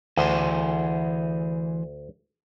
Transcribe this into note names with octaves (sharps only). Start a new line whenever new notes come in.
D2 E3 G#4 C5